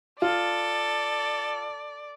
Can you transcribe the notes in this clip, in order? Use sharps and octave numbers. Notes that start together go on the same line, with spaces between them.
F4 A4 D5